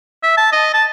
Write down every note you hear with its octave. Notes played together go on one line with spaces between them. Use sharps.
E5
A5
D#5
A5